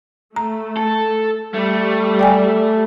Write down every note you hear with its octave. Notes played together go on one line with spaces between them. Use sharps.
A3 A#5
A4
G3 A3
D5 G5 G#5